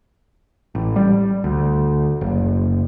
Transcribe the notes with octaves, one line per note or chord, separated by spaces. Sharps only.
A1
G3
D2
F#1